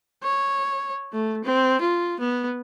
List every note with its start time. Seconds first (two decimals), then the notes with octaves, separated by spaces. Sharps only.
0.23 C#5
1.13 A3
1.44 C4
1.81 F4
2.20 B3